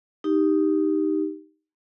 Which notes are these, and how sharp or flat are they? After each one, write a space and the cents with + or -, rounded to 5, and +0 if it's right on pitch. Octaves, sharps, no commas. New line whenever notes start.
D#4 +0 G4 +0